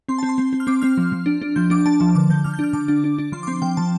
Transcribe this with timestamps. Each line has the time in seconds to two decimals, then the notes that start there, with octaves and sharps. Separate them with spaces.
0.08 C4 C6
0.18 C4 A5
0.29 C6
0.38 C4
0.53 C4
0.60 F6
0.67 C4 D6
0.82 C4 F6
0.98 F3
1.12 F3
1.26 D4
1.42 D4
1.56 F3 G6
1.70 D4 D6
1.86 D4 A5
2.00 F3 A5
2.15 D3 D6
2.29 D3 G6
2.44 D3 F6
2.54 G6
2.59 D4 F6
2.73 D3 D6
2.88 D4
3.04 D4
3.18 D4
3.32 F3 C6
3.43 D6
3.47 C4 C6
3.62 F3 G5
3.77 F3 A5